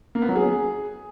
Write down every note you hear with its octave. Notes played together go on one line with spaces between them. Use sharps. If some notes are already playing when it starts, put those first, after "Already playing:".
A#3
B3
F#3
G#4